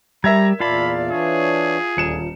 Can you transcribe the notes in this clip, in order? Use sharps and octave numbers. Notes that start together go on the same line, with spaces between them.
G3 A#4 E5 A#5 G#6
E2 A#2 F4 D5 F5 A5 B5
E3 D4 G#4 C#5
D#1 D2 D3 C#7 E7